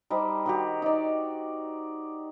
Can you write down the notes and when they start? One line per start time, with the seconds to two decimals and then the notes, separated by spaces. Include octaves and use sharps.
0.10 G3 D#4 G4 C5
0.46 D#3 F#4 G4
0.82 D#4 D5